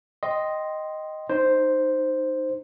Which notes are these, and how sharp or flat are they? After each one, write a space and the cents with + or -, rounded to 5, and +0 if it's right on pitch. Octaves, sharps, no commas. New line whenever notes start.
D#5 +0 G5 -10 C6 +0
D#4 -10 C5 +0